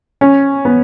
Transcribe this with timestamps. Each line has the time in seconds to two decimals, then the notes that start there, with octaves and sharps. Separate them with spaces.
0.21 C#4
0.65 B3